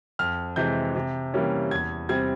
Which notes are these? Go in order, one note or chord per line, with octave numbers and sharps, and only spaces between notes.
F2 F6
C3 E3 G#3 G6
C3
E3 G3 A#3 C#4
E2 G#6
C3 G3 C4 G#6